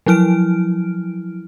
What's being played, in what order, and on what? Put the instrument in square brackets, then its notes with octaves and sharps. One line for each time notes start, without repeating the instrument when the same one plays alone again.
[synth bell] F3 F#3 E4 F6 D7